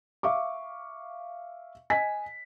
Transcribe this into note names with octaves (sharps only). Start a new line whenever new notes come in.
E5 F5 C#6 D6
D#5 G#5 B6